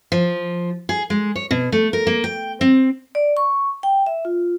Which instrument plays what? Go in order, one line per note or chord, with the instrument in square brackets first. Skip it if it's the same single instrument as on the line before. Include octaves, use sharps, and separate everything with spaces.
[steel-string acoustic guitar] F3
G#4
G#3
C#5
B2
A3
A#4
A#3
G5
C4
[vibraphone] D5
C#6
G5
E5
F4